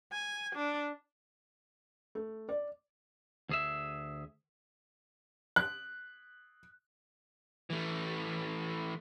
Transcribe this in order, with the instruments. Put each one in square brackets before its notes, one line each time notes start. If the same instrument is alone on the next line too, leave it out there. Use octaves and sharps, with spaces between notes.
[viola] G#5
D4
[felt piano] A3
D5
[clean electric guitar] D2 G#4 E5
[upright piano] F#6
[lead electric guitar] E3 A3